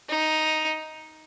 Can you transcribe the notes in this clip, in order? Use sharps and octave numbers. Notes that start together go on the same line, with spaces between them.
D#4